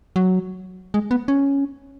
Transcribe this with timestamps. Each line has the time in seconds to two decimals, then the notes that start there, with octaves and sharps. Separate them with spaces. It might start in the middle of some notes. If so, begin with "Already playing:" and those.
0.16 F#3
0.94 G#3
1.11 B3
1.28 C#4